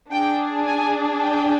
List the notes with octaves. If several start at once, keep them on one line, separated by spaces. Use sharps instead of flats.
D4 G#4 G5
G#5
G5